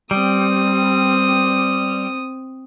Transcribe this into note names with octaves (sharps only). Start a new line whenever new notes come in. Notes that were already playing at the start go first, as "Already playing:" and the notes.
G3 C4 D#6